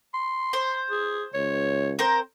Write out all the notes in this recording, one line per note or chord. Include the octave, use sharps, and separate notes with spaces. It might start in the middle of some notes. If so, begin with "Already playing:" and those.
C6
C5
G#4
C#2 C#5
C4 A#4 C5